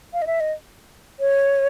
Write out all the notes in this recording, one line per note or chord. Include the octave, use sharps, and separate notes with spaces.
F5
D#5
E5
D#5
C#5